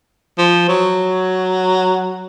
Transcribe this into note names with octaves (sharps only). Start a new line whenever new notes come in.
F3
F#3